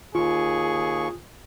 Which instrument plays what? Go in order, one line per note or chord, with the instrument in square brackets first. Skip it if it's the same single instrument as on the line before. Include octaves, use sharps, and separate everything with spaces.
[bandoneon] D#2 C#6 [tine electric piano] F4 [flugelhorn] G#4